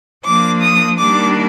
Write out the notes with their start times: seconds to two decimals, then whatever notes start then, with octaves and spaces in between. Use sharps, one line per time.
0.24 F3 A#3 D4 D6
0.62 D#6
0.98 D#3 G3 A#3 D4 D6